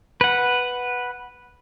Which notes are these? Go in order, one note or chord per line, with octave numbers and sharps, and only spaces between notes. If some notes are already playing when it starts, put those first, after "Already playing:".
B4 F#5